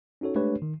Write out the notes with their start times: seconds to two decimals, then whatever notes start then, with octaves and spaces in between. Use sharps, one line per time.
0.21 C#4 D#4 F#4 A4 C#5
0.35 G#3 A3 D4 G4 B4 C#5
0.62 D#3